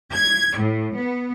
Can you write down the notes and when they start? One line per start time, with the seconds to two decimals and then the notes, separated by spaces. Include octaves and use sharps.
0.13 G#6
0.57 A2
0.95 B3